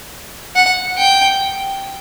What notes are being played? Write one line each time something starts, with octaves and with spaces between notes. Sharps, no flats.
F#5
G5